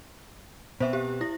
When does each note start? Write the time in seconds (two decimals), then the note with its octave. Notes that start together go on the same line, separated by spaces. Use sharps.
0.80 B2 B3 C4 C5 E5
0.93 G4
1.21 E4 A#6